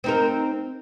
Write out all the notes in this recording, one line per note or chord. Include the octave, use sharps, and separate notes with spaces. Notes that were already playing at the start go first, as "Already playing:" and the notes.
C4 D#4 A#4